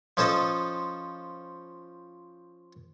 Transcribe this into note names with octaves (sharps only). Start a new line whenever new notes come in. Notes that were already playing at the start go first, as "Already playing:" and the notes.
F3 C#4 A4 C5 D#5